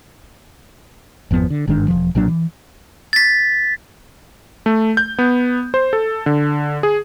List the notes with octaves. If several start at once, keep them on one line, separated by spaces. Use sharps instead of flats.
G#1 F2 F3 B3
D3
G1 G#2 D#3 D4
E1 A2 F3
B1 A#2 F#3 D4
E3
A6 B6
A3
G6
B3
C5
A4
D3
G#4